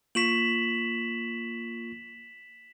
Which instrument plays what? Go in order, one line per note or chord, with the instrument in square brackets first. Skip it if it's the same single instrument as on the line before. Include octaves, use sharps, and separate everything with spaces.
[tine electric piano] A#3 F4 C#6 [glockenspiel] B6 E7 F#7